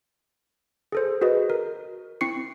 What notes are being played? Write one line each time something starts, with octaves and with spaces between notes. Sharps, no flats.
G#4 A4 C5
F#4 G#4 B4 D#5
A#4
C4 E4 C#6 C7 C#7